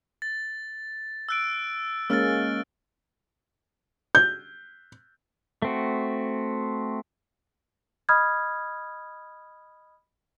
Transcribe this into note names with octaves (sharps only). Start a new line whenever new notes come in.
A6
E6 F#6 D7
G#3 A#3 C#4 E6 F6 A6
G6
A3 C4 F#4
D#5 B5 D#6 F6 G#6